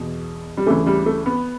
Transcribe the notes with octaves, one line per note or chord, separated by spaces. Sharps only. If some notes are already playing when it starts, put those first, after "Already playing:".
Already playing: E2 B2
G3
D2 C#3 E3 A3
G3
A3
B3